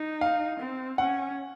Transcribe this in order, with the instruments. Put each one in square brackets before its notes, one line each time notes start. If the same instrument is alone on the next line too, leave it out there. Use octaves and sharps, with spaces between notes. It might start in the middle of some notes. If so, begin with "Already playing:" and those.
Already playing: [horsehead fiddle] D#4
[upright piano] F5
[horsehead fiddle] C4
[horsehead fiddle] C#4 [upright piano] F#5